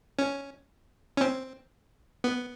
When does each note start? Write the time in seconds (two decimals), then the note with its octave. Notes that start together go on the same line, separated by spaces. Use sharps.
0.19 C#4
1.17 C#4
1.21 C4
2.24 B3